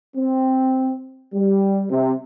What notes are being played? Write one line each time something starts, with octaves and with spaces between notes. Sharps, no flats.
C4
G3
C3